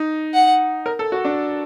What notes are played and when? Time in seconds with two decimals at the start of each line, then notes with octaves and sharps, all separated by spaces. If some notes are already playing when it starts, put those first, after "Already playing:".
Already playing: D#4
0.34 F#5
0.86 A#4
0.99 A4
1.12 F#4
1.25 D4